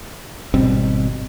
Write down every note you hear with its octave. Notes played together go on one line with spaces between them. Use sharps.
G#1 B2 G3 C4